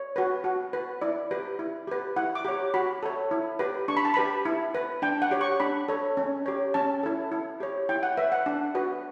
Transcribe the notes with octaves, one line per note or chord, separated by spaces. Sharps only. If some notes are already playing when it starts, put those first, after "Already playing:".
Already playing: C#5
F#4 B4
F#4
B4
E4 D5
G4 B4
E4
G4 B4
E4 F#5
D6
G4 C#5
F#4 B5
A4 C#5
E4
G4 B4
D4 C#6
B5
A5
G4 B4 B5
E4
B4
D4 G5
F#5
G4 C#5
C#6
D4 B5
A4 C#5
C#4
G4 C#5
C#4 A5
E4 A4
E4
G4 C#5
E4 G5
F#5
B4 E5
F#5
D4
F#4 B4